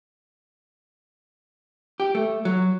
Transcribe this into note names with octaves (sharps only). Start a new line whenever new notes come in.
G4
A3
F#3